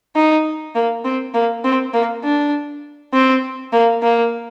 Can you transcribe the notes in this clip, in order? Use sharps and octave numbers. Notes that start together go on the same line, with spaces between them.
D#4
A#3
C4
A#3
C4
A#3
D4
C4
A#3
A#3